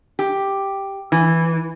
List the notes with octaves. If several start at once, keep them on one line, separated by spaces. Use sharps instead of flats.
G4
E3